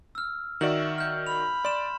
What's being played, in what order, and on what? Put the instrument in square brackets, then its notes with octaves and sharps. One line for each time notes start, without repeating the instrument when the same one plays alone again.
[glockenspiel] E6 F6
[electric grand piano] D#3 F#4 D5 [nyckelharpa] E5 [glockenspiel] F#7
[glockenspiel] F6 G6
[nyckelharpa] B5 [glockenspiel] F7
[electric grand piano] D5 [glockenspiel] C6 E7